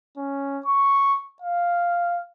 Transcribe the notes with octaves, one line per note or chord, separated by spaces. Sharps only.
C#4
C#6
F5